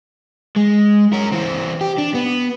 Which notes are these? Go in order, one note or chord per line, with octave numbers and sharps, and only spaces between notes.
G#3
C#4 A#4
E3 C4
G4
D4
B3